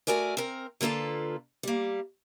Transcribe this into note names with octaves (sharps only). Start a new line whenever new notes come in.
A3 F#4 A#4 D5 G#5
C4 A#4
D3 A#3 F4 A4 B4
G3 A#3